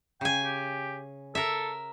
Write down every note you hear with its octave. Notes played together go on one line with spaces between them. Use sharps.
C#3 G5 G#5
G4
A4 A#4 E5